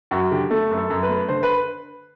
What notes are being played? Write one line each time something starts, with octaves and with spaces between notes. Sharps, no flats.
F#2 F#4
D3 G4
A3 A4
F#2
A4
F#2
B4
A3
D3 C5
B4